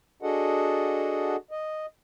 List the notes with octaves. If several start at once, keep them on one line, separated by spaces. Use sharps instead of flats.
D4 F#4 G#4 A4 D#5 F#5
D#5